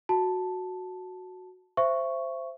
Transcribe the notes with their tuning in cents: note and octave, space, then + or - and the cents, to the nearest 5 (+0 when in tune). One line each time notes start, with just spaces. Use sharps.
F#4 -10 A5 +0
C5 +0 E5 +25 C#6 +0